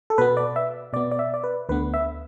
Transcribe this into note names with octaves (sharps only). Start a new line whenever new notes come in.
A4
B2 B3 B4
D5
E5
B2 B3 D5
D5
E5
D5
B4
D2 D3 B3 B4
E5